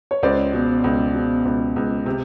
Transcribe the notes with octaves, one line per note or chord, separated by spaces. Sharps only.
C#5
C#2 C5 D5
B2
C#2
B2
C#2
C#2
C3